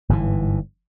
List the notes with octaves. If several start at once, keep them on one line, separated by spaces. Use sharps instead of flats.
G1 G#2 C3 E3